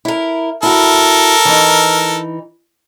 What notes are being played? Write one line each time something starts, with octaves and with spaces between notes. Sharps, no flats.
E4 A#4
E4 F#4 A4 A#4
E3 D#4